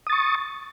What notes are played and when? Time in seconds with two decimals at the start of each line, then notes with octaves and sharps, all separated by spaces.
0.07 D#6
0.10 A6
0.13 C#6